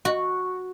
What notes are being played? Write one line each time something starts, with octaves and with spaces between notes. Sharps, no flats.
F#4